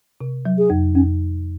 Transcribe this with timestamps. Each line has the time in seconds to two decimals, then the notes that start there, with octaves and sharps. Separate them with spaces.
0.21 C3
0.45 F#3
0.58 G#4
0.70 F2
0.94 F2 C#4